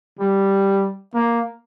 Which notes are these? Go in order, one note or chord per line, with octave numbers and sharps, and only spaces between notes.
G3
A#3